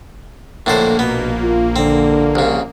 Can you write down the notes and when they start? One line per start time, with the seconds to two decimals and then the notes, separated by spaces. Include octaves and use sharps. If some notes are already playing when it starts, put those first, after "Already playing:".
0.66 A#1 A2 D3 A#3 A4 C5
0.99 B2 B3
1.40 F4
1.76 D3 C4
2.35 C2 C#3